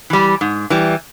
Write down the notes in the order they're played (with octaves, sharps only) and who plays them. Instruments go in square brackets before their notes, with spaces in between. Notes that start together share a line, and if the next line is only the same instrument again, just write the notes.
[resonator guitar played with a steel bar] E3 G3
G#2
E3 G3